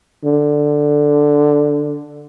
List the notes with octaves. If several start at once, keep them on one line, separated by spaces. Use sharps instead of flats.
D3